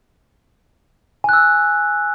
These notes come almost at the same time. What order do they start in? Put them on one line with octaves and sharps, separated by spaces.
G#5 F#6 E6